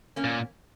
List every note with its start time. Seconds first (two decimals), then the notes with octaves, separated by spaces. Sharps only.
0.16 A#3 C#4
0.24 A#2